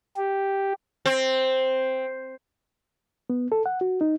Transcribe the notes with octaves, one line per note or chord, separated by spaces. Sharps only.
G4
C4
B3
A4
F#5
F#4
D#4